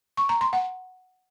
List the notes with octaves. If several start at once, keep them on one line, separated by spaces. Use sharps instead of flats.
C#6
A#5
C6
F#5